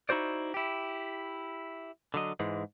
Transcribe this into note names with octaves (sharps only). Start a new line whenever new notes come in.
D#4 E4 F#4 C5 D5
E4 G4
D3 F#3 D#5
G#2 E3 G#3